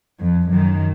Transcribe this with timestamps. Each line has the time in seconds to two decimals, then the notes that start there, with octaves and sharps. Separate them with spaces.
0.20 F2
0.50 F#2 D#3